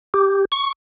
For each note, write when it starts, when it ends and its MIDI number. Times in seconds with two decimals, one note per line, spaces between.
0.14 0.45 67
0.52 0.72 85